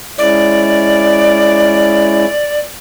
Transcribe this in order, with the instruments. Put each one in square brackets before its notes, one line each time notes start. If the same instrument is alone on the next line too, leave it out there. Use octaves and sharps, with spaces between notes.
[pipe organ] G#3 C#4 E4 [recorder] D5